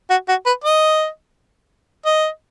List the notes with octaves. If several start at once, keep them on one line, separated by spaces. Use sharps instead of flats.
F#4
F#4
B4
D#5
D#5